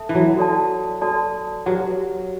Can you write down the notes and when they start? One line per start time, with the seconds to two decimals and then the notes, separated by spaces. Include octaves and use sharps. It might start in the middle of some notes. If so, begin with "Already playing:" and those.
Already playing: A4 E5 A5
0.09 E3
0.15 F#3
0.37 F#4 A4 D5 A5
1.02 F#4 A4 D5 A5
1.66 F#3 G4 B4 F#5